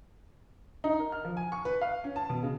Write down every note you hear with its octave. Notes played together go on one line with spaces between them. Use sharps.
D#4
A#4
F6
F3
G#5
C#6
B4
F5
C#4
A5
B2
C#3